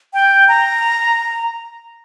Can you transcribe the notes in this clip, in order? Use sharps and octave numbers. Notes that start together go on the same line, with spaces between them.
G5
A#5